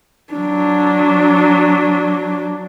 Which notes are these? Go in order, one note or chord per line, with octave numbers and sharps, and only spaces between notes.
F#3 D4